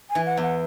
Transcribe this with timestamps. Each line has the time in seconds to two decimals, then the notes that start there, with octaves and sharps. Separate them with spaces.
0.10 G#5
0.15 E3
0.26 F#5
0.37 E2
0.43 F#5